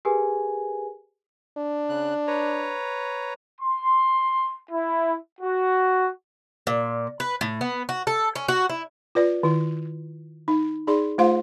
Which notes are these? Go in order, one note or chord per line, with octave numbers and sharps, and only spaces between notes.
G4 G#4 A#4 B4 G#5
D4
C#3 F#6
B4 C#5 A#5
C6
E4
F#4
A#2
B4
A2
B3
F#4
A4
C#4
F#4
E4
F4 B4 D5
D#3 E4
D#4
D#4 G#4 D5 C6
A3 F4 C5 F5 C6